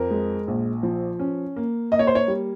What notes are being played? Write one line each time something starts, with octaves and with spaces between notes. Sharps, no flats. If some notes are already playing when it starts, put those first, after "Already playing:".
Already playing: F2 A#4
G#3
A#1
F3
C#4
A#3
A#3 D#5
C#5
C5
C#5
G3